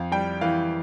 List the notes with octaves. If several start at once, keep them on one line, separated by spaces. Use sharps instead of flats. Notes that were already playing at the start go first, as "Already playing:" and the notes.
Already playing: F2 F5
G3 G5
E3 F5